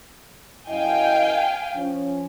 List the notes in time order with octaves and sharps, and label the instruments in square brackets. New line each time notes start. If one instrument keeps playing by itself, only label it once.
[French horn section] F#2 E4 D#5 [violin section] F5 G5 G#5
[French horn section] F3 C#4